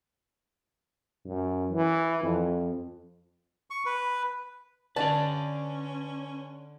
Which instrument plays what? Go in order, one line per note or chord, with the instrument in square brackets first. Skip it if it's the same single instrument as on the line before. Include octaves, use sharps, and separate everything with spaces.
[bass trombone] F#2
E3
F2
[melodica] C#6
B4
[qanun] D3 [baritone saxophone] C#4 [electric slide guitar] B4 D5 [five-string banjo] A5